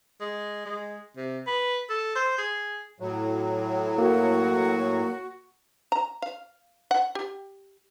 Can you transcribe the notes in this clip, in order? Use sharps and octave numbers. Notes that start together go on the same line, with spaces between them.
G#3
G#3
C3
B4
A4
C5
G#4
A2 F#3
A#3 F#4
A#5
F5
F#5
G4